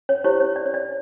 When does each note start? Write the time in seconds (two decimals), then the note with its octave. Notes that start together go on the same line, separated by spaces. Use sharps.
0.09 C#5
0.24 E4 G4 C5 C#5
0.41 C#5
0.56 D5
0.66 C#5
0.74 D5